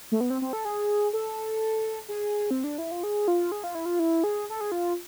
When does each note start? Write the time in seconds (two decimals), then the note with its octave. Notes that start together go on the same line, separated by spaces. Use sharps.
0.12 A3
0.21 B3
0.30 C4
0.42 C4
0.53 A4
0.65 G#4
1.13 A4
2.08 G#4
2.51 C4
2.64 D4
2.78 E4
2.91 F4
3.03 G#4
3.28 F4
3.52 G#4
3.64 F4
3.75 E4
3.86 F4
3.99 E4
4.24 G#4
4.50 A4
4.61 G#4
4.72 F4